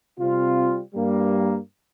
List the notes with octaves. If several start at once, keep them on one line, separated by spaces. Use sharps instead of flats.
C3 G3 C4 F4
G2 G3 A#3